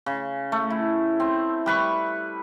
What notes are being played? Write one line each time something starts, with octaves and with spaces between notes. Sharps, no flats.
C#3
A3
E4
C4
G3 B4 C#6